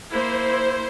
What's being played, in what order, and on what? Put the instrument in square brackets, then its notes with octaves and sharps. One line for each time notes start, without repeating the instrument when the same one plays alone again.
[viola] A#3 E4 [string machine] C5